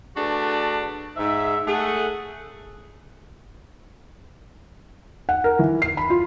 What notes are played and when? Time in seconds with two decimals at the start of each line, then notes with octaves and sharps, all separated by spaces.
0.16 A3 D4 F#4 G#4 B4 D5
1.17 G#2 E5
1.67 A3 G#4 F#5
5.29 F#5
5.44 A#4
5.59 E3
5.82 C7
5.97 B5
6.10 F4